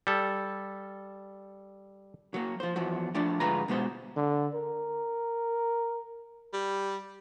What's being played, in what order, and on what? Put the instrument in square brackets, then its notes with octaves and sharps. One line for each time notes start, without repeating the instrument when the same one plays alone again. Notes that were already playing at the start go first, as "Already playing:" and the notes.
[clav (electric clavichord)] G3 A4
[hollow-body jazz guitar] F#3 A#3
F3 C5
E2 F3 F#3
F3 A3 D4 D5
D2 G#2 G#3 F4 B4 A#5
B2 G#3 B3 C5
[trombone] D3
A#4
[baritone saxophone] G3